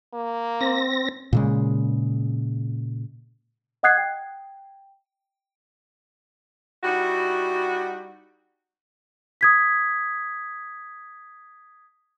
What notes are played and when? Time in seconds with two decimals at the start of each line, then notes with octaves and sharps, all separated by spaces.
0.14 A#3
0.61 C4 A#6
1.33 A#2 C#3 G#3
3.83 D#5 F#5 D#6 F#6 G#6 C7
3.98 G5
6.84 G3 D#4 E4 F#4
9.41 D#6 G#6 B6